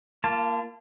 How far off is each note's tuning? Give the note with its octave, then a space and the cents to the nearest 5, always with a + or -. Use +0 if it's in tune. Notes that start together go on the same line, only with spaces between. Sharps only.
A#3 +0 F4 -35 A5 +0